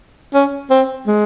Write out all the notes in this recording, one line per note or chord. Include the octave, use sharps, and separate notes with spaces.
C#4
C4
G#3